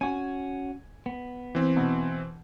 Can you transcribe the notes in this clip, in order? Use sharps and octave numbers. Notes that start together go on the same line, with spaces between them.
C#4 F#4 G#5
B3
E3 C4
B2